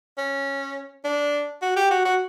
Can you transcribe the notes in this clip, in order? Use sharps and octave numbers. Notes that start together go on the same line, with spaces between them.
C#4
D4
F#4
G4
F#4
F#4